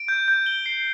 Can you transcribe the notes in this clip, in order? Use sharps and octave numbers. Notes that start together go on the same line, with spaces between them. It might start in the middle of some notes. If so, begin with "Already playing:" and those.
Already playing: D7
G6
G6
G7
C7